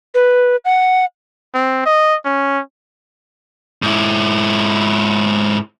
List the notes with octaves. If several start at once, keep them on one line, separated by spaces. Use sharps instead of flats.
B4
F#5
C4
D#5
C#4
G#2 E4